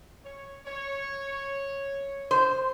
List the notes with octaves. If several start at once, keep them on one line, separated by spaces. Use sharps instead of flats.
C#5
C#5
C5